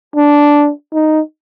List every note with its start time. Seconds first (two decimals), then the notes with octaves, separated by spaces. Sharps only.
0.16 D4
0.93 D#4